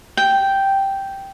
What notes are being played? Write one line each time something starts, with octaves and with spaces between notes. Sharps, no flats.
G5